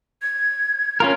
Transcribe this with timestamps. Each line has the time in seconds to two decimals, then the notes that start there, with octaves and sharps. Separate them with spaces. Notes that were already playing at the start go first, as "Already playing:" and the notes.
0.22 G#6
1.00 C#4 F4 A#4